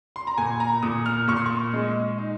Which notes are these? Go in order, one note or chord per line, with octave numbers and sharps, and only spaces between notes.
C6
A#5
A#2 G#5
A#5
A#2 D#6
F6
A#2 C#6
C6
C#6
G#3
D#4